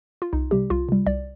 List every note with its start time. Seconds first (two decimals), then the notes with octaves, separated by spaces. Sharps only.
0.22 F4
0.33 C2 D#4
0.51 C3 G3 G4
0.70 C2 F4
0.89 C3 G3
1.07 C2 D5